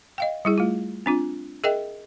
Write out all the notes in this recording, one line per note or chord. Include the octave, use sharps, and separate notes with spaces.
D#5 F5 G5
G3 E4 G#4
A3 F4
C4 D4 F4
G#4 A#4 D#5 E5 G5